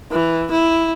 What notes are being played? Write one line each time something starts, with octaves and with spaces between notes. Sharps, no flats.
E3
E4